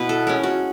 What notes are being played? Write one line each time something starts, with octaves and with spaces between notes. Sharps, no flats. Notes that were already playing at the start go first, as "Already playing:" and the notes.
Already playing: B2 B3 E4 B4
A4
G#3 C#4 A#4
F#4